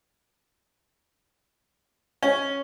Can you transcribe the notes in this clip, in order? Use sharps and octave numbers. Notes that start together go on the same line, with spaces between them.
C#4